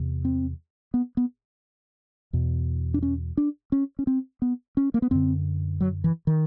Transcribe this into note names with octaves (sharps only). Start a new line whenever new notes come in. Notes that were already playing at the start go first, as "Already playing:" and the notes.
Already playing: E2 C3
C4
B3
B3
E2 B2
D4
C#4
D4
C#4
C#4
C4
B3
C#4
A#3
B3
F#2 D3 C4
F#3
E3
D#3